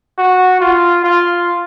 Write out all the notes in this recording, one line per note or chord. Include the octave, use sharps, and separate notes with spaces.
F#4
F4
F4